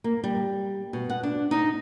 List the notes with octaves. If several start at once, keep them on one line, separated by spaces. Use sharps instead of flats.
A#3
G3
B2
F#5
D4
D#4